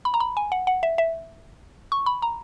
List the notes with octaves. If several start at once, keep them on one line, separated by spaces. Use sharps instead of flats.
B5
A#5
B5
G#5
F#5
F#5
E5
E5
C#6
B5
A#5